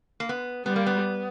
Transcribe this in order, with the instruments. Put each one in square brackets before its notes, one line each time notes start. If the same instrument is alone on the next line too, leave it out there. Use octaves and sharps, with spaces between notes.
[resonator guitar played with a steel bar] A#3
B3
[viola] G3 [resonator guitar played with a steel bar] B3
[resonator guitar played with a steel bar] A#3
B3